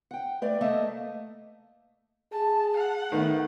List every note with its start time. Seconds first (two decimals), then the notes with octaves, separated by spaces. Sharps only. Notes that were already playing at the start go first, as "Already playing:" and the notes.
0.11 F#5 G5
0.42 A3 B4 D5
0.61 A3 A#3 D#5 E5 A5
2.32 G#4 A5
2.77 F#5
3.12 D#3 A3 B3